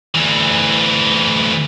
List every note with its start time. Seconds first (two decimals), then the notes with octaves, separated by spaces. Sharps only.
0.15 D2 E3